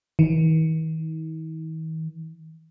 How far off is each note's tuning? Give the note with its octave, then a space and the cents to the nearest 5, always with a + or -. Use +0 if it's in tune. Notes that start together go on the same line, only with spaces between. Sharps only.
D#3 +45